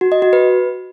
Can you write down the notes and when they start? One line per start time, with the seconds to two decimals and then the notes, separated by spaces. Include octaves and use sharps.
0.01 F#4
0.12 D#5
0.22 F#4
0.33 B4